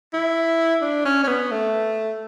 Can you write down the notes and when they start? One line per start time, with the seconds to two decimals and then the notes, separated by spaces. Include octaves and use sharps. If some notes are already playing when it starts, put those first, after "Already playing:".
0.13 E4
0.82 D4
1.05 C#4
1.24 C#4
1.28 B3
1.51 A3